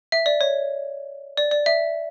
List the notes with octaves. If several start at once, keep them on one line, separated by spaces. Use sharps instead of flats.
E5
D5
C#5
D5
D5
E5